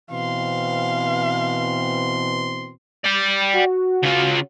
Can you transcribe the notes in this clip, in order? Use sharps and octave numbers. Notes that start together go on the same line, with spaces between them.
B2 E3 C4 F5 C6
D5 G5
F#4
C#3 F4